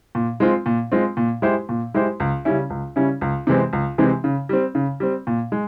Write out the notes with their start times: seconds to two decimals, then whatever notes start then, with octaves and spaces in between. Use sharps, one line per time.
0.15 A#2
0.40 G#3 C4 F4
0.66 A#2
0.92 G#3 C4 F4
1.17 A#2
1.42 G#3 E4 G4 C5
1.69 A#2
1.94 G#3 E4 G4 C5
2.20 C#2
2.45 C#3 G3 C#4 E4
2.70 C#2
2.96 C#3 G3 C#4 E4
3.21 C#2
3.47 C3 E3 G#3 C4
3.73 C#2
3.98 C3 E3 G#3 C4
4.24 C#3
4.49 G3 C4
4.75 C#3
5.00 G3 C4
5.27 A#2
5.52 G#3